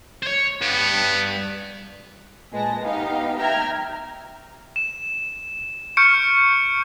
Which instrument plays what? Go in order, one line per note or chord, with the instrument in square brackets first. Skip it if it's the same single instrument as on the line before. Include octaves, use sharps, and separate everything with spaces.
[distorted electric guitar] C5 C#5
[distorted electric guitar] G2 [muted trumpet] B3
[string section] A#2 G#3 B4 A5 A#6
B3 D#4 G4 F5
E5 G5 A#5 F6 G#6
[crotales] E7
C#6 F6 G6 C#7 D7